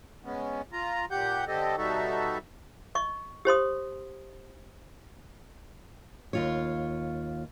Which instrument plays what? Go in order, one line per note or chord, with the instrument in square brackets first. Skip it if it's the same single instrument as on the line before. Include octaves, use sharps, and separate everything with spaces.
[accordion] G#3 B3 C#4
F4 A#5
A#2 G4 F#5 G6
D3 C4 G4 A4 D#5
B2 G3 D#4 F#4 A4 E5
[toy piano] D#5 C#6
G4 C5 C6 D#6
[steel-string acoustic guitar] D#2 F4 C#5